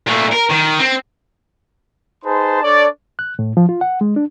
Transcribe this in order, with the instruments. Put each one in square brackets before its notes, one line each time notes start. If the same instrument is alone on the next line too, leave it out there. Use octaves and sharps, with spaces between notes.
[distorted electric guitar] A#2 A3
A#4
D#3
C4
[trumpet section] D#4 G#4 B4 C5 A5 C6
D4 A4 C#5 D5
[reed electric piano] F#6
A2
F3
F4
F#5
G#3
D4